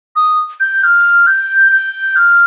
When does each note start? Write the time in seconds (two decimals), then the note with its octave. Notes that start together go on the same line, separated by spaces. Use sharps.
0.16 D#6
0.60 G6
0.84 F6
1.27 G6
1.72 G6
2.16 F6